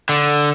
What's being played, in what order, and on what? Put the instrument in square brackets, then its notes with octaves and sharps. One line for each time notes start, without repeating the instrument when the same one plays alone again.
[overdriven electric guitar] D3